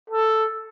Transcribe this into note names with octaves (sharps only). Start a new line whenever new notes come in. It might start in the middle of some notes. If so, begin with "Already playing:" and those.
A4